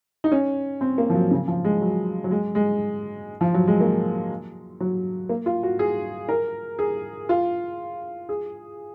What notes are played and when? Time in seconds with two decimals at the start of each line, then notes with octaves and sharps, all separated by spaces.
0.24 D#4
0.32 C#4
0.81 C4
0.98 A#3
1.10 F3
1.15 F#3
1.31 C#3
1.48 F3
1.65 G#3
1.81 F#3
2.24 F#3
2.31 G#3
2.55 G#3
3.41 F3
3.54 F#3
3.67 G#3
3.81 A#3
4.80 F#3
5.29 A#3
5.46 F4
5.63 F#4
5.79 G#4
6.29 A#4
6.79 G#4
7.29 F4
8.29 G#4